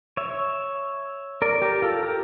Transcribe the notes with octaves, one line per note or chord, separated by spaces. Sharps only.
C#5 E5
A#4 D5
G4 A#4
F4 A4
G4 A#4